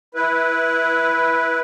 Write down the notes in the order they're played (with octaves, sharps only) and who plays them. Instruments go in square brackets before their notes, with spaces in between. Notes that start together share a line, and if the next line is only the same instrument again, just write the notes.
[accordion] E4 B4